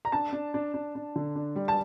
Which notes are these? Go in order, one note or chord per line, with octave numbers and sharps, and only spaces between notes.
A#5
D4 A5
D4
D4
D4
D4
D3
D4
G3
A5